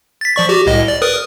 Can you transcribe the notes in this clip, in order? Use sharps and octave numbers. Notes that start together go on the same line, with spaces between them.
A6 B6
F3 D5 C#6
F#4 G4
C2 A2 D#5
D5
A#4 B4 D#6